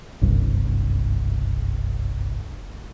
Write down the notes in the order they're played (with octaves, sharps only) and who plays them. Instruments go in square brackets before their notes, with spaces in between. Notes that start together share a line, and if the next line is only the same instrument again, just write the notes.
[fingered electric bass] F#1 C2 G2